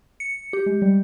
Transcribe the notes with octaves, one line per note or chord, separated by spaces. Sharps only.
C#7
G4
G#3
G3